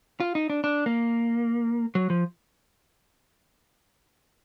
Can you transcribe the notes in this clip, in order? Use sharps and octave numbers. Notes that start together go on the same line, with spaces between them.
F4
D#4
D4
D4
A#3
F#3
F3